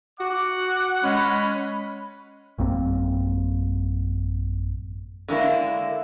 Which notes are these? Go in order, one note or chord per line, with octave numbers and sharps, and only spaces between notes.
F#4 F#5 D6
G#3 C#4 B5
A1 F#2 A#3 C4
D3 G#3 A#3 E4